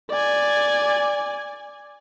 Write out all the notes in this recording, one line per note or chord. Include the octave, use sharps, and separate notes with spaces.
D5 G#5